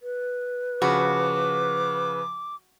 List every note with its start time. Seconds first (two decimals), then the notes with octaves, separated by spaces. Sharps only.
0.01 B4
0.82 C#3 F3 F#4 B5 D6